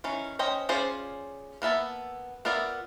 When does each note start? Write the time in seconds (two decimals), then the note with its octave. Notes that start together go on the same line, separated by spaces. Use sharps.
0.04 D#3 E3 C#4
0.39 C#4 C5 D#5 G5 A#5
0.69 C#4 F4 G#4 C5 D5
1.62 A#3 B3 E5 A5
2.45 B3 F4 A#4 D5 E5